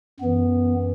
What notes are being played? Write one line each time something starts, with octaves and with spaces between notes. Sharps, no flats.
F#2 E3 B3